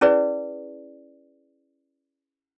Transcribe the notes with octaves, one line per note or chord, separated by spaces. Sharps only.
C#4 E4 G#4 B4 D5